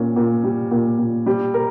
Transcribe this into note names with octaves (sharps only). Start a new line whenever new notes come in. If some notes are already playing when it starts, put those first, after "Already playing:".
Already playing: A#2 C#4
A#2
G3
A#2
A#2
G3
A#4